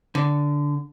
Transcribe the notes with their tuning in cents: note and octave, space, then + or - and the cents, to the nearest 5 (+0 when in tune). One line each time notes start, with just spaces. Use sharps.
D3 -10